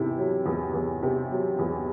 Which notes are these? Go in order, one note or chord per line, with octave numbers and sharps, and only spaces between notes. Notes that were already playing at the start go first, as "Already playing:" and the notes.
Already playing: E2 C3 E4
F#3
E2
E2
C3
F#3
E2